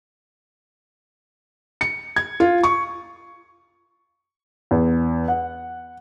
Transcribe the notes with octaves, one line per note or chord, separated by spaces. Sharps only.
C#7
G#6
F4
C#6
E2
F#5